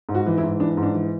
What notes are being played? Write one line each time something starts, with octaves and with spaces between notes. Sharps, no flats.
G#2
F#4
E3
E4
G#2
E3 D4
G#2
D4
E3